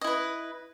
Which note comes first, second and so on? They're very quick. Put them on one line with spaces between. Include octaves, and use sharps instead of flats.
D#5 E4 B4